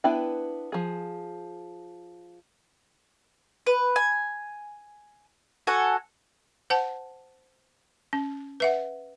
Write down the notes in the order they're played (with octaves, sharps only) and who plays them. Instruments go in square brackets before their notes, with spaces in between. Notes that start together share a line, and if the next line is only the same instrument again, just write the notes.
[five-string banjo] B3 D4 E4 B4 G5
F3 G#4
[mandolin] B4
G#5
F#4 A4 F#5 G#5
[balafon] C5 F#5 A5
C#4
B4 E5 F#5